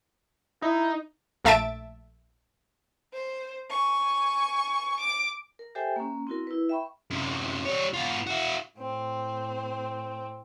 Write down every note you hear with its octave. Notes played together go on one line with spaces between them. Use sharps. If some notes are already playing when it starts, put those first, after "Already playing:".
D#4 E4
A#1 A3 E5 A5 A6 D7
C5
G#5 C#6
D6
A#4
G4 A4 C5 E5 G5 G#5
A#3 C#4
C4 E4 F#4 A#4
E4 B4
E5 G5 B5 C#6
F#2 C3
G3 C#5
B3 F4
E4 F#4
A2 C4